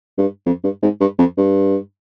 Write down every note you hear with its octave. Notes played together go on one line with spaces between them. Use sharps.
G2
F2
G2
G#2
G2
F2
G2